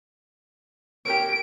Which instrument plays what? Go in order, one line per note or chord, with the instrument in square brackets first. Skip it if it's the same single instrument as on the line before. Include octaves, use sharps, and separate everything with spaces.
[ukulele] G4 A#4 C#5 [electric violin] D7